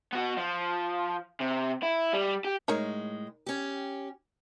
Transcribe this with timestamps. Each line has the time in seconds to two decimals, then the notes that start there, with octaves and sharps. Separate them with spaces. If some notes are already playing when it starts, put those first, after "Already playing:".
0.13 B3 F#4
0.37 F3
1.41 C3
1.83 E4
2.13 G3
2.44 G4
2.68 A2 G#3 D#4 A#4 C#5
3.46 C#4 G4